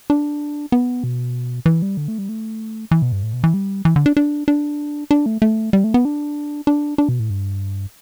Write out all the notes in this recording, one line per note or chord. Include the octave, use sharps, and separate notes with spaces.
D4
B3
B2
E3
G3
D3
A3
G3
A3
E3
B2
G2
A2
B2
E3
G3
E3
D3
D4
D4
D4
D4
A3
A3
G3
A3
B3
D4
D4
D4
B2
A2
G2